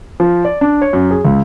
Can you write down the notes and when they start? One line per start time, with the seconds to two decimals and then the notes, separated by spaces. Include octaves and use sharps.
0.20 F3
0.45 D5
0.61 D4
0.82 C#5
0.93 F#2
1.11 G#4
1.25 C#2